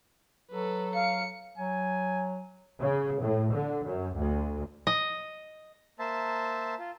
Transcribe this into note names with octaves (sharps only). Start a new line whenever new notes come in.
F#3 A4 B4
F5 C#7
F#3 G#5
C#3
A2
D3
F#2
D2
D#5
A#3 C5 E5 A5
F4